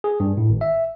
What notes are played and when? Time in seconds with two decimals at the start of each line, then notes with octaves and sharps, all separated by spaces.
0.04 G#4
0.20 G2
0.37 A2
0.50 G#1
0.61 E5